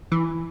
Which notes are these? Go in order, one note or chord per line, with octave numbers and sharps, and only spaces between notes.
E3